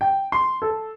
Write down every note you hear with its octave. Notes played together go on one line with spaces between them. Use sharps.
G5
C6
A4